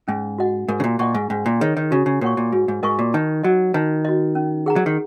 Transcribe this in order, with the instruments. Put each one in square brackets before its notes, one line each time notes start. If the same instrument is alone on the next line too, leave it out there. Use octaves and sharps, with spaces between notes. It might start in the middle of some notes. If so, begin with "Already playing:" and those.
[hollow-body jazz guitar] G#2 [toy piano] C#4
[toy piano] F#4 D#5 F#5
[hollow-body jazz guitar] G#2 [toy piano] A#4
[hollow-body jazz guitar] C#3
A#2
[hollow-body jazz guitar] A#2 [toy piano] D#5 F#5 C#6
[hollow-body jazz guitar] G#2
[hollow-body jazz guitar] G#2 [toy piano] C#4
[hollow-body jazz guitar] A#2
[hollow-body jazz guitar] D#3 [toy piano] G#4 C#5
[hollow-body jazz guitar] D#3
[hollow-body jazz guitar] C#3 [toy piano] F#4
[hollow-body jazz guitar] C#3
[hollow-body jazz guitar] A#2 [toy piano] A#4 C#5 F#5 C#6
[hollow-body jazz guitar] A#2
[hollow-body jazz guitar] G#2 [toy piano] F#4
[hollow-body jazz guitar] G#2
[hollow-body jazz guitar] G#2 [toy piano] A#4 D#5 G#5 C#6
[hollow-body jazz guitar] A#2
[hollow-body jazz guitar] D#3 [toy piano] D#4
[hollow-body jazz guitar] F#3 [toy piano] F#4 D#5
[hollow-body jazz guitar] D#3 [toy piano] D#4
[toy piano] F#4 D#5
C#4
G#4 F#5 A#5
[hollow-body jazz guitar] F#3
D#3